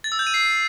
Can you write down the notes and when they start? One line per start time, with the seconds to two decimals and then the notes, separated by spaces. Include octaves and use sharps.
0.04 A6
0.12 E6
0.19 G6
0.27 D#7
0.34 C7